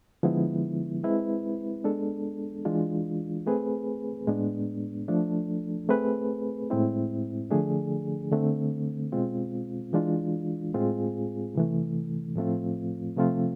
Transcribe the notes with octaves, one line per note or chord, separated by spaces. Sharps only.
D3 F3 G#3 B3 E4
G#3 C4 E4 B4
G#3 B3 D4 A4
E3 G#3 D4 F4
A3 C4 G#4 B4
A2 G#3 B3 D4
F3 A3 D4 A4
A3 C4 G#4 B4
A2 G#3 C4 E4
D3 F3 A3 D4 G#4
D3 A3 C4
B2 G#3 C4 F4
E3 G#3 D4 F4
A2 G#3 C4 F4 G#4
C3 E3 A3
A2 F3 A3 C4 F4
C3 F3 A3 C4 F4